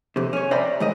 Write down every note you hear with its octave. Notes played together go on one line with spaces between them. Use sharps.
F2 C3
C#4 C#5
C5 D5 E5 G5 A#5 B5
G#2 D#3 D#5